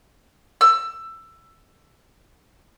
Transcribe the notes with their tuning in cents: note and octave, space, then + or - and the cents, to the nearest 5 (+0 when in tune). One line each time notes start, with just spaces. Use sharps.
E6 +15